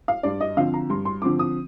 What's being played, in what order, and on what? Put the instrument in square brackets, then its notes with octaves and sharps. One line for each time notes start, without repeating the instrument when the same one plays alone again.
[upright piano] F5
G2 D5
D#5
D3 F3 C4 F5
A#5
G2 C6
C6
D3 F3 C4 D6
D#6